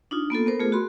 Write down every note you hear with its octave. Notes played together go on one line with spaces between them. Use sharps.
D4 D#4 F4
A#3 B3 F4 A4
B3 A#4 C5
A3 F4 G#4
F#4 B5 C6